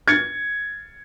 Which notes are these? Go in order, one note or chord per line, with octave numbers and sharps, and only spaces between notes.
G#6 A6 C#7